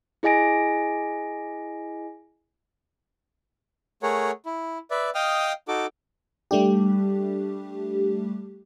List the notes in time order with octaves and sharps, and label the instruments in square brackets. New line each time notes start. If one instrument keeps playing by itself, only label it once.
[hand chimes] E4 G#4 D#5 G#5 A#6 D7
[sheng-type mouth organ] A3 G#4 A#4 C#5 F#5
E4
B4 D5 E5
D#5 F5 G5 D#6 F6
D#4 F#4 A4 D6
[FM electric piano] G3 A3 D4 G4